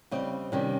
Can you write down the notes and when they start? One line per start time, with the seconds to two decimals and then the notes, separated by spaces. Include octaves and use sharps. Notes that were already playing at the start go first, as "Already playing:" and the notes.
0.11 C#3 G3 C4 D#5
0.52 C3 D#3 G3 C#4